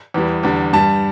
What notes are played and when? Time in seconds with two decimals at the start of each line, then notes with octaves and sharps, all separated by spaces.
0.14 E2 E3 G3
0.43 E2 D3 G3
0.73 G2 G3 A5